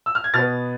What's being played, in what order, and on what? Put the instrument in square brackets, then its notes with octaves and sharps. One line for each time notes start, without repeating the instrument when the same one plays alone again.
[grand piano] E6
F6
G#6
B2 F6 A6
B3